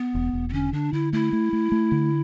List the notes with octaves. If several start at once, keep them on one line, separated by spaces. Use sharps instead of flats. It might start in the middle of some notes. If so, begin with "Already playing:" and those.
Already playing: B3
E1
E1
B3
D3 C#4
D3 D4
D3 E4
A3 E4
A3
A3
A3
D3